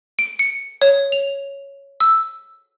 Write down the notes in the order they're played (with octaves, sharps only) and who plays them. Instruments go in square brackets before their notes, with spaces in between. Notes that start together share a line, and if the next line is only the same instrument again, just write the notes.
[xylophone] D7
C#7
C#5
F7
E6